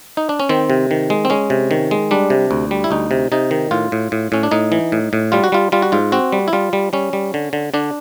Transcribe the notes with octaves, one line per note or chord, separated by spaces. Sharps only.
D#4
D4
C#4
D#3 C4
C3
D#3
G#3
C4
G#3 C#4
C3
D#3
G#3
G3 D4
C3
D2
G3
E4
D2 D#4
C3
C3 D#4
D#3
A2 F4
A2
A2
A2 C#4
D4
A2 D#4
E3
A2
A2
G3 F4
F#4
G3 F4
G3 F4
F#4
G#2 F4
C4 F#4
G3
E4
G3 F4
G3
G3 C#4
G3
D3
D3
D3 D4